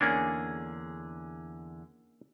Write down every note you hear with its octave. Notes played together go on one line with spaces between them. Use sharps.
E2 D3 A#3 C#4 D4 G#4